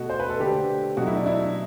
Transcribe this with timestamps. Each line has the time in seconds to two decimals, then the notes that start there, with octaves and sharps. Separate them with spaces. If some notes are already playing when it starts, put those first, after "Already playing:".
Already playing: B2 A3 F#4
0.10 C5
0.20 B4
0.30 A4
0.40 D3 A3 G4
0.97 B2 F#3 A3 F#4
1.07 E4
1.16 D4
1.26 E4